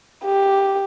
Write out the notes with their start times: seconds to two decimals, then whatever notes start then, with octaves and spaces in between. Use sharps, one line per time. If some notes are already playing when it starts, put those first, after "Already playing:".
0.24 G4